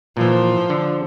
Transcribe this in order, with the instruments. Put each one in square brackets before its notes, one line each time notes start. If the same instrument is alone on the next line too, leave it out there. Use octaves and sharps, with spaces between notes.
[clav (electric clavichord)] A#2 E3 [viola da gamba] F3
[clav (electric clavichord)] D3